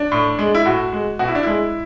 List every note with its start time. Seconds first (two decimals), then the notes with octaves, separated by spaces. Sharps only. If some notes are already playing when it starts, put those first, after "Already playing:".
Already playing: D4
0.12 A2
0.39 G#3
0.55 E4
0.65 A2 F#4
0.93 G#3
1.19 B2 F#4
1.28 E4
1.35 D4
1.43 G#3 E4